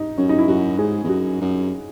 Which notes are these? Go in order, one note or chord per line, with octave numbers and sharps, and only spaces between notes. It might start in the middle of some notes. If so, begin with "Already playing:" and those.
Already playing: D#4
F#2 C#4
D#4
E4
F#2 F#4
G#2 G#4
E2
F#2 F#4
F#2